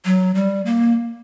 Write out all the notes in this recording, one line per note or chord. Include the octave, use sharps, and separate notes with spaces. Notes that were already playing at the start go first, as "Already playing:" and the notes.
F#3
G3
A#3